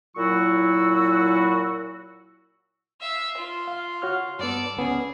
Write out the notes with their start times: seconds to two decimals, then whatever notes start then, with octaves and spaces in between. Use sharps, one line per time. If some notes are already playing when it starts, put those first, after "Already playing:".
0.16 A#2 F#3 E4 F#4 C#6 E6
3.01 E5 F5
3.37 F4
3.68 F5
4.02 F#4 C#5 F6
4.39 G2 B3 A4 D5
4.77 C#2 B3 C#4 G#4